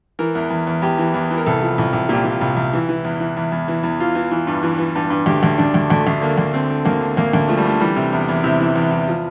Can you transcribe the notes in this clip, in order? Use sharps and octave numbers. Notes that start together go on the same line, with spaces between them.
E3 A#4
E2
E2
E2
E2 G4
E3
E2
E3
A#4
C2 A4
F3
C2
C2
A#2 G4
A#2
C2
C2
E3
E3
E2
E3
E2
E2
E3
E2
E3 F4
E3
E3
G2
E3
E3
G2
G2
D2 G4
D2
D2 D4
D2
D2 A3
D2
D3 A#3
D2
D3 C4
D3
D2 A#3
D3
D2 A#3
D2
F3 A3
G3
D3 A3
E3 G3
C3
E2
E2
C3 E4
E3
E2
E2
F3